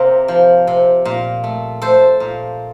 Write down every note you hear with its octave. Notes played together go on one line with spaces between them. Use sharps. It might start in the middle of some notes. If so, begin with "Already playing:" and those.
Already playing: C3 A#3 G4 A#4
F3
C3
A#2
A3
A3 A4 C5
A#2